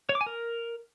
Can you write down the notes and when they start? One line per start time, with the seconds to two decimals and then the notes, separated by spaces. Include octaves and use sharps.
0.09 C#5
0.15 D6
0.21 G#5
0.26 A#4